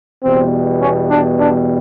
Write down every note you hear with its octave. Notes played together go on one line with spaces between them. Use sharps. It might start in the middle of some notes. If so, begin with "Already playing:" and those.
E2 B2 G3 C4
C#4
D4
D4